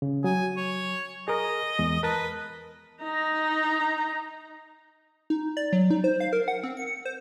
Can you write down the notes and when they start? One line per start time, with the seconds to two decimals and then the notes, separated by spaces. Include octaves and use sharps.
0.02 C#3
0.24 F#3 G#5
0.57 C#5
1.28 G#4 A#4 D#5
1.79 E2 G#3
2.03 A#4 B4 A5
3.02 D#4 A#5
5.30 D#4
5.57 D5
5.73 F#3
5.91 D#4
6.04 C5
6.20 F5
6.33 A#4
6.48 F#5
6.63 C4
6.77 C#7
7.05 C5